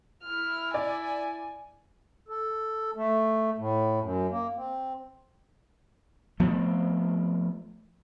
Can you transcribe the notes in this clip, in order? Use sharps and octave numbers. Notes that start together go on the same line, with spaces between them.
E4 F6
D5 G#5
A4
A3
A2
F#2
A#3
C4
F3 A3 B3 C4